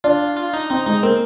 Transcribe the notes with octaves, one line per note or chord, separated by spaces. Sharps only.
D4 F4
F4
D#4
C4 D#4
G#3 D#4
A#3 C4